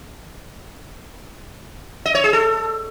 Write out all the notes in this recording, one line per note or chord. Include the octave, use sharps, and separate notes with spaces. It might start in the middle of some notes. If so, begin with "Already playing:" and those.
D#5
C#5
G#4
A4